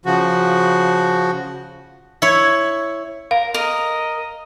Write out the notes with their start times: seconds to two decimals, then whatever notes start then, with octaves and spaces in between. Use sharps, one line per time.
0.06 C#3 F3 F#4
2.22 E4 C#5
3.31 A#4 F5
3.54 A#4 D#5